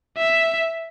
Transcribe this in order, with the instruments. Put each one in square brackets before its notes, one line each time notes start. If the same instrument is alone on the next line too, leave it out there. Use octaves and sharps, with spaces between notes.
[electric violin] E5